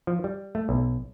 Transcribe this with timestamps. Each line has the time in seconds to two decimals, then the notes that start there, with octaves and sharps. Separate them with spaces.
0.07 F3
0.24 G3
0.55 A3
0.69 B1